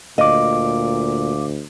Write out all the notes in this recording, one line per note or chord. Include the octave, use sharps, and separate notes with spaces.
D2 A#2 D#5 F5 D6